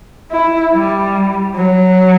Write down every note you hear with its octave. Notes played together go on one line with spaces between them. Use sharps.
E4
G3
F#3